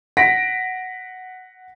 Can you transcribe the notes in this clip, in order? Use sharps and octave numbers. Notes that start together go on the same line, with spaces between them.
F#5 A#6 B6 D7